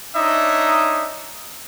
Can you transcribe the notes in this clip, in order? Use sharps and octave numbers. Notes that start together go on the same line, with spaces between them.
D4 D#4 C#5 D#5 E5